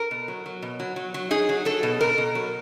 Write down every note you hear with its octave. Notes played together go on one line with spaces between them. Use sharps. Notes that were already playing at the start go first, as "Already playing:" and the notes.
Already playing: A#4
B2
F#3
F#3
B2
F#3
F#3
F#3
D#4 G#4
F#3
F#3 A4
B2
B2 A#4
B2
F#3